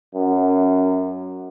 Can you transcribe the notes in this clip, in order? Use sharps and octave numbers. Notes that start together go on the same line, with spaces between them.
F#2